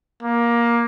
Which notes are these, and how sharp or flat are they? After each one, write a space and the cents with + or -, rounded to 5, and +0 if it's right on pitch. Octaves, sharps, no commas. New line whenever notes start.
A#3 +15